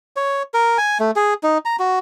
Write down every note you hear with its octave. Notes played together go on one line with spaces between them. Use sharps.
C#5
A#4
G#5
A3
G#4
D#4
A#5
F#4